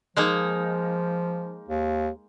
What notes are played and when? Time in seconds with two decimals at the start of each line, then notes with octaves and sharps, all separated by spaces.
0.17 F3 G#3 A#3 D#4
1.69 D#2